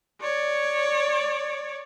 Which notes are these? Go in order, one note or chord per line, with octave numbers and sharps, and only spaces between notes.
C#5 D5